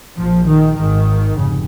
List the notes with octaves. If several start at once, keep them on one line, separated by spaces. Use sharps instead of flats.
A#1 A#2 F3
D#3
G#2 D#3
G#1
F1 C#3